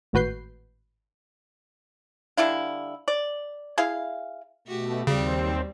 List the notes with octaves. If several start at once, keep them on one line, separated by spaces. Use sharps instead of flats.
G#1 A2 F#4 B4 G6 C7
D3 G3 E4 F5
D5
E4 G#4 F5
B2 A3 F#4 G4
D#2 C#3 G3 C4